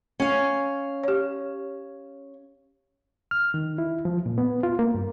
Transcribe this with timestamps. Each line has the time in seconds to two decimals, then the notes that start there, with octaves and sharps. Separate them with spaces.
0.20 C#4 F5
1.04 G4 C#5
3.31 F6
3.54 D#3
3.78 E4
4.05 F3
4.26 A#2
4.38 B3
4.63 F4
4.79 A#3
4.94 G2